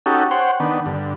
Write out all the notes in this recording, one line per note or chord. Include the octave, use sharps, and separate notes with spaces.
C#4 D#4 F#4 G4 A4
C5 C#5 F#5 G5 C6
D#3 B3 D4
G2 D3